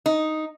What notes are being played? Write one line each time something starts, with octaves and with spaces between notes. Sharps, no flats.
D#4